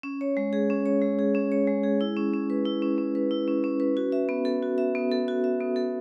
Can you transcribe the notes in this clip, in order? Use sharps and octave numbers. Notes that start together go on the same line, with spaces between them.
C#4
C#5
G#3
G#4
C#4
C#5
G#3
G#4
C#4
C#5
G#3
G#4
E4
C#4
C#4
B4
E4
C#4
C#4
B4
E4
C#4
C#4
B4
F#4
E5
B3
A4
F#4
E5
B3
A4
F#4
E5
B3
A4